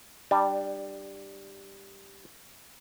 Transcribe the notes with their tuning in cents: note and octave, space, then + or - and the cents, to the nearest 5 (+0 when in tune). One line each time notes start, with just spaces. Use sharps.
G3 +0 D4 +25